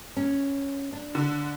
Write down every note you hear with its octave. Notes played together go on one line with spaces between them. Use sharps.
C#4
D4
D3